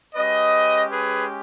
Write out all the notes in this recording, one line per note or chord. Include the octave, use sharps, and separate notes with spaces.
G#3 C#4 G4 B4 D#5
G#4 B4